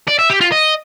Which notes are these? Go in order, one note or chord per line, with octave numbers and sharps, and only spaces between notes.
D5
E5
G4
F4
D#5